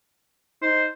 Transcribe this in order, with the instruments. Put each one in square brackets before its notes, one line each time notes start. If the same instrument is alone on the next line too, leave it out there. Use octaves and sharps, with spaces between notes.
[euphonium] D#4 [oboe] C5